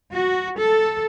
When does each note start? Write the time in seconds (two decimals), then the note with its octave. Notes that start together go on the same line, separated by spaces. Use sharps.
0.13 F#4
0.58 A4